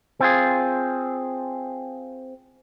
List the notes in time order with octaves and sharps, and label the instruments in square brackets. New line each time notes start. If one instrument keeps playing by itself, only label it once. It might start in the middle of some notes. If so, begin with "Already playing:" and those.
[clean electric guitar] C4 F4 G#4